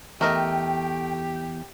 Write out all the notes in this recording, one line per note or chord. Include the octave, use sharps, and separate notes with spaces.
E2 A3 G4 A#4 D#5 G5